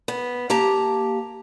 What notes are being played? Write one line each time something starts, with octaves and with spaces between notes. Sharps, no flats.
B3
A#3 G4 A5 A#5